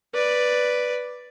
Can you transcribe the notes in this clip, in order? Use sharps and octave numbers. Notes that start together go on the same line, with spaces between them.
B4 D5